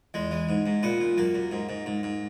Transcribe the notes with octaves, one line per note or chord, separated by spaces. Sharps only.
E2 G#3
E3
G#2
G#2
A#2 B3
A#2
F#2 A#3
F#2
G#2
G#2
G#2
G#2